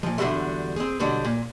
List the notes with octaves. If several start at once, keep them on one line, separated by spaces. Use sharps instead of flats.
A#2 F3
E2 D3 E3 F#3 G3 A3
C4 G#4
B2 D3 F#3 G3
A#2